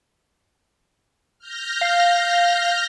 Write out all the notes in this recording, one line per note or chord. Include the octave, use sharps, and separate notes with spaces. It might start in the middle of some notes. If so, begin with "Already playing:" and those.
F6 G6 A#6
F5